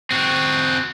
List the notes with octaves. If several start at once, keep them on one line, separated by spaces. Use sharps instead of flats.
C4 F#4